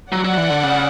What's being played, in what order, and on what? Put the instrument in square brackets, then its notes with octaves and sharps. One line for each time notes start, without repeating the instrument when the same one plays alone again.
[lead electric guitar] F#3 [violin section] D5 F#5
[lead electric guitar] F#3
E3
D3
C#3